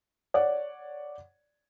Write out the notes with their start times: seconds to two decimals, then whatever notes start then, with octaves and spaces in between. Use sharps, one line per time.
0.34 C#5 D5 F#5